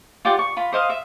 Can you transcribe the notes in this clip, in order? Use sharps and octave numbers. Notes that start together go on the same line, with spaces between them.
F4 G4 D5 F#5
C#6
F4 B5
C5 D#5 F5 D#6
E5